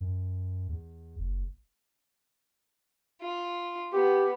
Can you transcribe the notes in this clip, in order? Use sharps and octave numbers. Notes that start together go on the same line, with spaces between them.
F#2
E2
F#1
F4
B3 G4